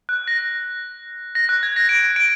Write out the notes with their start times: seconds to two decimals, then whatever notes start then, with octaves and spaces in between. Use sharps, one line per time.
0.09 F#6
0.28 A#6
1.35 A#6
1.49 F#6
1.63 G#6
1.76 A#6
1.89 D7
2.16 D7